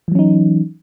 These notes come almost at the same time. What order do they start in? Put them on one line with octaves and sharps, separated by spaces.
E3 F#3 C#4 D#4